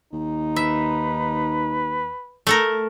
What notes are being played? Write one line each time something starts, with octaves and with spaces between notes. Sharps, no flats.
D#2 D#4
B4 E5
A3 A4 A#4